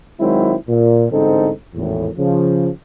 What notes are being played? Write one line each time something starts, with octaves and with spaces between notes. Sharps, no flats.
D#3 F#3 G#3 C4 E4
A#2
A1 G#2 D3 C4 D#4 A4
G#1 E2 A2
C#3 F3